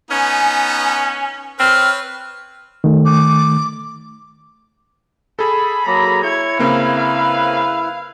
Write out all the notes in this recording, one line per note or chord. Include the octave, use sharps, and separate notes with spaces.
B3 C#4 D#4 G#5
C4 B4 C#5 F6
D#3 A3
D6
G#4 A4 B5
F#3 A#3 A#5
E4 C#5 G#6
C#3 A#3 C4 B4 F5